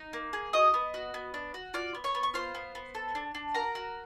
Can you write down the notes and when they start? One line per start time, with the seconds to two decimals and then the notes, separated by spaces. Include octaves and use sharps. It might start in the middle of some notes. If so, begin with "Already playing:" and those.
Already playing: D#4
0.13 A#3
0.33 G#4
0.53 F#4 D#5 D#6
0.74 B3
0.94 F#4
1.14 B3
1.34 D4
1.54 F#4
1.74 F4 D5 D6
1.95 B3
2.04 C#5 C#6
2.15 B3
2.23 C#6
2.34 F4 C5 C6
2.55 B3
2.75 B3
2.95 A4
3.15 D4
3.35 D4
3.54 F#4 A#4 A#5
3.75 F#4